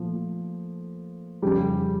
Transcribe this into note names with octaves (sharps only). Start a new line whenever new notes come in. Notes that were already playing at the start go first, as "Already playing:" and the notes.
Already playing: A#2 F3 A3
F2 C#3 G3 G4